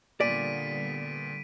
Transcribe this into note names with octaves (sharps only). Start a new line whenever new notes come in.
A#2 D3 G3 B3 D5 B6 D7 D#7